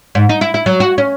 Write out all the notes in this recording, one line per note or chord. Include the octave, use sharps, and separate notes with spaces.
G#2
D#4
E4
E4
F#3
F#4
C#4